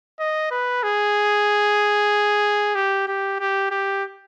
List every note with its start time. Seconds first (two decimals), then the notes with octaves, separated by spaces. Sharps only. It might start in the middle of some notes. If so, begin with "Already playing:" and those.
0.20 D#5
0.51 B4
0.83 G#4
2.75 G4
3.07 G4
3.40 G4
3.71 G4